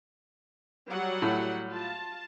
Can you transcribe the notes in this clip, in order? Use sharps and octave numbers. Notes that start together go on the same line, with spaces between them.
F#3 G3 F#5
A2
F4 A5